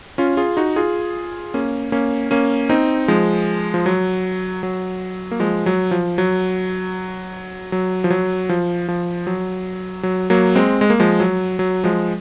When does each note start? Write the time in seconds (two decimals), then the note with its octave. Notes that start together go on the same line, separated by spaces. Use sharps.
0.18 C#4 F4
0.37 F4 G#4
0.57 D#4 F#4
0.76 F4 G#4
1.54 A#3 C#4
1.92 A#3 C#4
2.31 A#3 C#4
2.69 C4 D#4
3.08 F3 G#3
3.74 F3
3.86 F#3
4.63 F#3
5.31 A#3
5.40 F3 G#3
5.66 F#3
5.91 F3
6.18 F#3
7.72 F#3
8.04 F3
8.10 F#3
8.49 F3
8.88 F3
9.27 F#3
10.03 F#3
10.30 F#3 A#3
10.55 G#3 C4
10.81 G#3
10.90 A#3
11.00 F3 G#3
11.20 F#3
11.59 F#3
11.84 F3 G#3